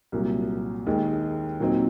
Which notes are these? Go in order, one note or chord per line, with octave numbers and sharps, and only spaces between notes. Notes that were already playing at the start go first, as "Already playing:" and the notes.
C2 A#2 F#3
D#2 D#3 G#3
A#2 F#3 C4 D#4